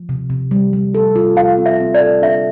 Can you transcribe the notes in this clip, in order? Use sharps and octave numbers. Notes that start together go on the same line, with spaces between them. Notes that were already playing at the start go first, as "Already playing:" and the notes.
Already playing: F3
C3
C3
G3
G3
A4
F4
F4 F5
C4
E5
C4
D5
A4
D4 E5